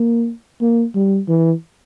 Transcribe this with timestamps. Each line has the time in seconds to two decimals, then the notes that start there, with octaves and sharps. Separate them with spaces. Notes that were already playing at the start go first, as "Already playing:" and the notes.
Already playing: A#3
0.61 A#3
0.95 G3
1.28 E3